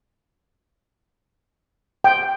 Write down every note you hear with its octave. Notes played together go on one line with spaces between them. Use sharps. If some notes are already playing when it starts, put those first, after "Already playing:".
G5